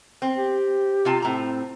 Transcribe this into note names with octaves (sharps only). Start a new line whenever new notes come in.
C4
G4
C3 F4 A5
A2 C4 A#5